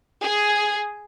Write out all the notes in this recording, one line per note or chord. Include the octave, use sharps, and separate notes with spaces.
G#4